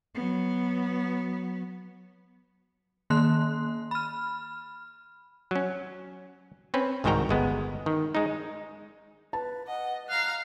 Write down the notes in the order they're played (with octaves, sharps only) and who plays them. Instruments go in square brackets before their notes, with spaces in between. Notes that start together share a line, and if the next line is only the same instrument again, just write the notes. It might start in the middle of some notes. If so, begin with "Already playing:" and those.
[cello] F#3 B3
[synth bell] D#3 A#3 C6 F#6
B5 F6
[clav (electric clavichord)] F#3 C#4
C4 C#4 B4
C2 G#2 D#3 F#4 G5 A#5
G1 G#3 B3
D#3
G#3 D#4
[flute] B4 [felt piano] A5
[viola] D#5 [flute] F#5
[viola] F5 A#5 [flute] F#6